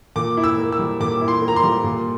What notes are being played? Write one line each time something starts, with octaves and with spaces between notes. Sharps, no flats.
A#2 D6
E4
E6
A#3
E6
G3
A#2 D6
E4
C6
A#3
A#5
C6
G3
A#2